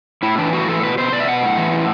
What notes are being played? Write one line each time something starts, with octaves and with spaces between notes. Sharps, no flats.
A2 E4
E3 D4
A2 F#4
E3 A4
B2 B4
B2 C5
B2 D5
E5
B2 F#5
A2
E3
A2